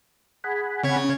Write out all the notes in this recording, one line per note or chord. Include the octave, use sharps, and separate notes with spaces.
G#4 F#5 G#5 B5
C#3 C4 C#5 G#6
C#4